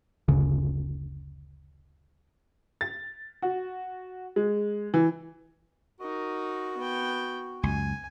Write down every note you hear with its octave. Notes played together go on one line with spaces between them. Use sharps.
F#1 D2 C#3
A6
F#4
G#3
E3
D#4 F#4 A#4
B3 G5
C#2 F#2 G#5